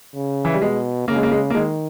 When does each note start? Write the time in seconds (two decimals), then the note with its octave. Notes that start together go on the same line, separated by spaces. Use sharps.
0.15 C#3
0.45 E3
0.53 G3
0.61 B2 G#3
1.08 C#3 A#3
1.16 G#3
1.23 A#3
1.31 G#3
1.50 A#3
1.54 D#3 G#3